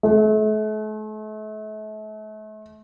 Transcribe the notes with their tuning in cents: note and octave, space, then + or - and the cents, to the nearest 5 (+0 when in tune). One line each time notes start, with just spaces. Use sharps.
A3 -40